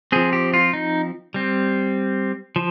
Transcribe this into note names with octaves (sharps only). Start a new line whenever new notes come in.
F3 C4 G#4
G4
F4
D#4
G3 C4
F3